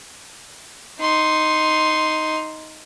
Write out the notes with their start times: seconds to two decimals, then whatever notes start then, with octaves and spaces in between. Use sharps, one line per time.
1.00 D#4 C6